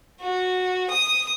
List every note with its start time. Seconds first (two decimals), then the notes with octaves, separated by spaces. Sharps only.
0.21 F#4
0.90 D#6